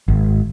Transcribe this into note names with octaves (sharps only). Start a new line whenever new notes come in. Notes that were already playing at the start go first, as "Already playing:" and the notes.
G#1